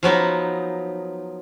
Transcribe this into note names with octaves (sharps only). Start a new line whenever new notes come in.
F3 F#3 B3 D#4